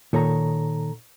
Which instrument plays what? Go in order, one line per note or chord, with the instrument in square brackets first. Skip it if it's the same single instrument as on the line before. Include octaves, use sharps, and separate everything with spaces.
[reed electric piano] A#2 A4 A#5 [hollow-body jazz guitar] D#3 C#5